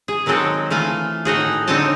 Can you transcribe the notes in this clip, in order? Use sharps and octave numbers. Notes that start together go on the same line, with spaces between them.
G#4
D#3 F#3 G#3 C4 A4 C#5
E3 A3 F4 G#5
A2 D#4 F#4 G#4
D3 C4 D#4 C#5 G#5 A5